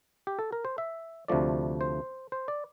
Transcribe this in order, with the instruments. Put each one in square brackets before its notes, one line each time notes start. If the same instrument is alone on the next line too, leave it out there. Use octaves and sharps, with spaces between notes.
[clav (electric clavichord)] G4
A4
A#4
C5
E5
D2 C3 F3 A3 D5
C5
C5
D5